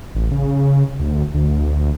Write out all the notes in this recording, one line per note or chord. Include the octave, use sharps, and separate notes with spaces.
A1
C#3
D2
D2